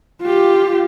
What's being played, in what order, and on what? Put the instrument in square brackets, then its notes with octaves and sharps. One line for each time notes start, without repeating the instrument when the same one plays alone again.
[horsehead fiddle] F4 G4